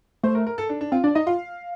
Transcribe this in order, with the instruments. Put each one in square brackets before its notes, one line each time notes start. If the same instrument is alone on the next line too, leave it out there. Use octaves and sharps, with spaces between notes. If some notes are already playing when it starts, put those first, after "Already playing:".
[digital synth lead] A3 [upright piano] C5
[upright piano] A#4
A#4
A4
D4
D4
[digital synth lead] C4 [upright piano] F4
[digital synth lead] D4 [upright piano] D5
[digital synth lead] D#4 [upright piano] D#5
[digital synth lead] F4 [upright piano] F5